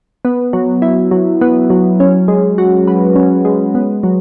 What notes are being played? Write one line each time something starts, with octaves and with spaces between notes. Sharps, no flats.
B3
F#3
E4
F#3
B3
F#3
C#4
G#3
F#4
B4
C#4
G#3
B3
F#3